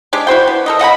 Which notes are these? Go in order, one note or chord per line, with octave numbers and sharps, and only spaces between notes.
G#3 D4 G4
E4 F#4 C5 G5
B3
A4 A#4 D#5
D#5 F#5 G5 B5